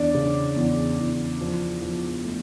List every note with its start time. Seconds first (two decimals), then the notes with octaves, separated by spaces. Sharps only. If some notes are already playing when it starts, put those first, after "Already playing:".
Already playing: E2 D4 D5
0.14 C#3
0.56 E2
0.99 E2
1.41 F3
1.82 F3
2.24 A3